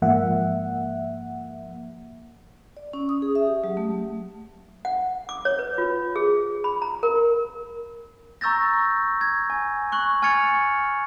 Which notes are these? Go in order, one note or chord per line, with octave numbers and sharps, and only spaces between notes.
G#2 F3 A#3 E5 F#5
D5
C#4
D#6
G#4
E5
G4
F#3
A3
F#5
D6
C#5
B4
F4
G#4
B5
A#5
A#4
A#5 C#6 E6 G6 A6 A#6
G#6
G#5
C#6 F#6 F#7
G#5 F6 G#6 A6 C#7 F7